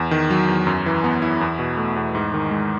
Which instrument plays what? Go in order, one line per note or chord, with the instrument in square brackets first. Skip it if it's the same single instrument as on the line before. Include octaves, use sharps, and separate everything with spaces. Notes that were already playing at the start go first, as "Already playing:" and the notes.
Already playing: [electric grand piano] E2
D#3
F#3
E2
F#2
E3
B3
E4
E2
B2
A3
E2
G#2
D#3
G#3